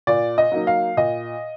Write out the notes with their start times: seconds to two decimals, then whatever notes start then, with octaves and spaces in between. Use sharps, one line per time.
0.07 A#2 D5
0.38 D#5
0.52 F#3 A#3 D#4
0.67 F5
0.97 A#2 D#5